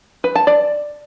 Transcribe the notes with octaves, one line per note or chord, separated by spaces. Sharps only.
B4
A5
D5